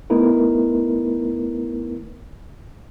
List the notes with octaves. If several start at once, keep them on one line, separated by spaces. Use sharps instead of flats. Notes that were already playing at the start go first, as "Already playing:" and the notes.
A3 B3 D#4 E4 A#4 B4